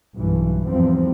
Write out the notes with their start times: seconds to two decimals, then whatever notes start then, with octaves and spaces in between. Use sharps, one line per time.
0.16 B1 G2 E3
0.68 E2 G#2 F3 G3 C4